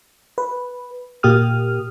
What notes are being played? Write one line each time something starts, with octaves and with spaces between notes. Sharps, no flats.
B4
A#2 A#3 G4 D#6 F6